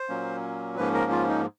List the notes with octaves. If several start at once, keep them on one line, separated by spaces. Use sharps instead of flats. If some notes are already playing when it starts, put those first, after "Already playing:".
Already playing: C5
A#2 F#3 A#3 C#4
G#2 F3 A#3 C#4 B4
A#4
F4
D#4